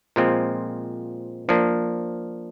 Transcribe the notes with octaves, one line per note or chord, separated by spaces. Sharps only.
A#2 F3 G#3 C4 F4
F3 A#3 D4